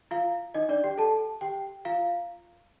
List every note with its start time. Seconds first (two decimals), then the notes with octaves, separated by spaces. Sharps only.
0.11 F4 F5
0.54 D#4 D#5
0.69 D4 D5
0.84 G4 G5
0.98 A4 A5
1.41 G4 G5
1.85 F4 F5